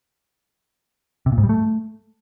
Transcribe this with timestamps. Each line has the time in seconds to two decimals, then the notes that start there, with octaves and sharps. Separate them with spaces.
1.26 C3
1.32 A#2
1.38 G#2
1.44 G3
1.49 A3